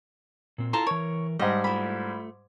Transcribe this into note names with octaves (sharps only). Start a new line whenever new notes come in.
A#2 C4
E4 F4 A4 A5 A#5 C6
E3 A#4 C#5
G#2 G3 D#5
A3 E4 F4 B5